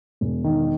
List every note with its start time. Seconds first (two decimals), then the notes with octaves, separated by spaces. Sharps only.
0.21 E1
0.44 D#3